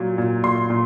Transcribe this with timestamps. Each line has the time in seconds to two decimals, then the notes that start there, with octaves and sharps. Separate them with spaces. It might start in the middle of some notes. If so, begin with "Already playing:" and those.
Already playing: A#2 F#3
0.18 A#2
0.43 A#2 C6
0.70 A#2